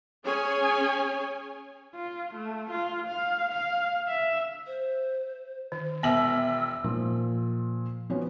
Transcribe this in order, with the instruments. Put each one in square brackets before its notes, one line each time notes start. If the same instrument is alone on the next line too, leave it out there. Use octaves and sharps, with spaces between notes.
[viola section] C#4 G#4 C#5 G#5
[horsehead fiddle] F4
A3
F4
F5
F5
E5
[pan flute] C5
[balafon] D#3
[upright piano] E1 E5 F#7 [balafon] B3 [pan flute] E6
[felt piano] A#2 F3
F3 B3 C#4 F#4